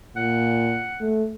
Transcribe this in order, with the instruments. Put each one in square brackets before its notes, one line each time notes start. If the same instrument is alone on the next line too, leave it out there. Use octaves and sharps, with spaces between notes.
[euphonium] A#2 [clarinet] F#5
[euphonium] A3